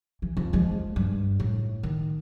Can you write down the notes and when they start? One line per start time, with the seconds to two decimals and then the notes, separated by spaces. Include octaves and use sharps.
0.22 E3
0.37 F2
0.53 F3 G#3
0.96 G2
1.40 A2
1.83 D#3